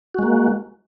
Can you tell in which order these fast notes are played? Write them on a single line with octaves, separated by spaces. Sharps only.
F#4 G#3 A#3